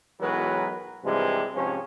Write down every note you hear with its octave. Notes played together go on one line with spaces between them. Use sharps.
B1 E3 F#3 G#3 A#4 B4
G2 C3 E3 F3 G3 G#3
G#2 C3 F3 C#4